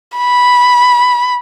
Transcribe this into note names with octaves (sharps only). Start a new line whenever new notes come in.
B5